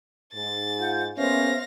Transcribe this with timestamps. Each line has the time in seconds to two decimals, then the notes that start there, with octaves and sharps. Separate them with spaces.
0.33 G#2 A6
0.79 F4 F#5 G6
1.18 G#3 A#3 B3 C#4 C5 E5 F5 A#6